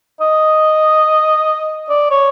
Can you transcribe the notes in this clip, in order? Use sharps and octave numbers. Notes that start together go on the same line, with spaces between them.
D#5
D5
C#5